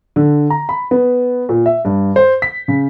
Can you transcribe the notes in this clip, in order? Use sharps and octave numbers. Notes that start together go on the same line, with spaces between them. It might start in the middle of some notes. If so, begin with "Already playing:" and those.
D3
A#5
B5
B3
A#2
E5
G2
C5
B6
C#3